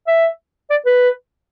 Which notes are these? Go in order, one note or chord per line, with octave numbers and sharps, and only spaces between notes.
E5
D5
B4